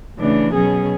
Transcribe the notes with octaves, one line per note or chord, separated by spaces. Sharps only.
C#3 E3 A3 D4
B2 F#3 C#4 G#4